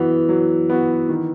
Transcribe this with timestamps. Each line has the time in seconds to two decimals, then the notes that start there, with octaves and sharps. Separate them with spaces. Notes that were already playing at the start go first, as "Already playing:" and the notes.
Already playing: E3 F#3 B3 F#4
0.29 F#3
0.70 B3 F#4
1.09 D#3